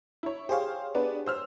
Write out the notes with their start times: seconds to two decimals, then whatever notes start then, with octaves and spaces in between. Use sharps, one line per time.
0.23 E4 C#5
0.49 G4 G#4 C5 C#5 F5
0.95 B3 D4 B4
1.26 C5 E6 F6